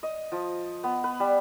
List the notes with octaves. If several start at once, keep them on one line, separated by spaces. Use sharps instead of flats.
D#5
F3
B3
B4
G3